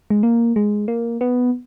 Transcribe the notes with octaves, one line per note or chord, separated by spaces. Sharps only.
G#3
A#3
G#3
A#3
B3